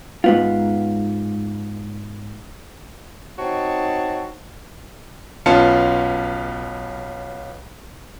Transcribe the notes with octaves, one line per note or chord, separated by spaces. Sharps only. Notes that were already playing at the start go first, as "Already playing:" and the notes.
G#2 B3 F4
C4 D#4 F#4 C#5 A5
B1 B3 C#4 F4 A5 C#7